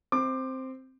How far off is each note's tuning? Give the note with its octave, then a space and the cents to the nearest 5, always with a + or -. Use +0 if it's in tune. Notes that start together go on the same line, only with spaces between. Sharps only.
C4 +0 D6 +25